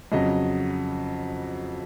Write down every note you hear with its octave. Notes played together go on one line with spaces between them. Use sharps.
F2 C#3 F#3 D#5